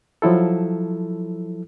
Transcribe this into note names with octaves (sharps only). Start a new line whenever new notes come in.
F3 F#3 E4 A4